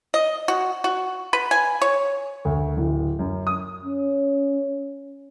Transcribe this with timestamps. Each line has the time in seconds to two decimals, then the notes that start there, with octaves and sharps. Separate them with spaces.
0.14 D#5
0.48 F#4
0.84 F#4
1.33 B4
1.51 G#5
1.82 C#5
2.45 D2
2.77 D1
3.19 F#2
3.47 D#6
3.85 C#4